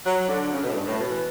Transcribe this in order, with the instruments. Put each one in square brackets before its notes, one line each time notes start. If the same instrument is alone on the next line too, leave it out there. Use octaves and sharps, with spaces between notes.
[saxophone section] F#3
D3
C#3
B2
A2
G2
A2
B2
E3